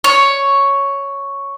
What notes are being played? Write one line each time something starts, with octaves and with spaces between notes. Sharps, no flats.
C#5